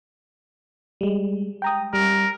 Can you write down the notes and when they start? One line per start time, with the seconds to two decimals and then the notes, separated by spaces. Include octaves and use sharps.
1.01 G3 G#3
1.62 G5 A#5 D#6
1.94 G3 A#4